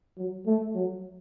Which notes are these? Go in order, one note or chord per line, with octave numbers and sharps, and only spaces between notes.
F#3
A3
F#3